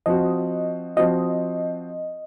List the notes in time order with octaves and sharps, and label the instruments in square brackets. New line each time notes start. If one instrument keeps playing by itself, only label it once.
[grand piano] F3 C4 F#4 [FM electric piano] D#5
[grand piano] F3 C4 F#4 [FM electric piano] D#5